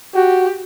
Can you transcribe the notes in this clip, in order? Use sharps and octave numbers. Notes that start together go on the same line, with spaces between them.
F#4 G4